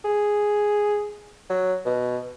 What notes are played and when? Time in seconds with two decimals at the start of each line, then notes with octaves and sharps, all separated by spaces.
0.05 G#4
1.49 F#3
1.85 B2